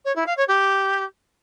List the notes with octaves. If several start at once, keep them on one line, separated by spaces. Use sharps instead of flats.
C#5
E4
F5
C#5
G4